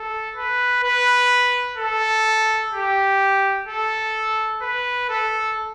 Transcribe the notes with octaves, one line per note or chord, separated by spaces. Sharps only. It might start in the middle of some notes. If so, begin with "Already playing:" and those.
Already playing: A4
B4
B4
A4
G4
A4
B4
A4